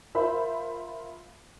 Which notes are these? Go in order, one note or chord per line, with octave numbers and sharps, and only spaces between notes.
F4 A#4 C5 E5 B5